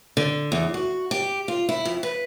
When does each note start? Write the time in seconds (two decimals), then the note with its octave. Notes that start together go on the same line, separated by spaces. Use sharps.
0.17 D3
0.52 E2
0.74 F#4
1.11 G4
1.48 F4
1.69 E4
1.85 F2
2.03 B4